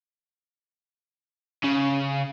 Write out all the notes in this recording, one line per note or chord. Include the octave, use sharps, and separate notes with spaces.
C#3